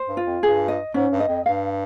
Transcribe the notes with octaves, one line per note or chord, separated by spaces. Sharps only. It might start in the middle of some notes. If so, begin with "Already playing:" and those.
Already playing: C5
G2
F4
F2
G2 G#4
D#5
G#2 C#4
G2
D#5
F2
G2 F5